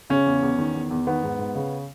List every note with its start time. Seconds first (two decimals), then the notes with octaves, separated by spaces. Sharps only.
0.10 C#3 C#4
0.26 E2
0.42 E2
0.58 D#3
0.75 E2
0.91 E2
1.07 D#3 B3
1.23 G#2
1.39 G#2
1.55 C#3